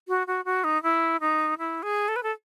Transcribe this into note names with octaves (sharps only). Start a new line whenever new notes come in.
F#4
F#4
F#4
D#4
E4
D#4
E4
G#4
A4
B4
A4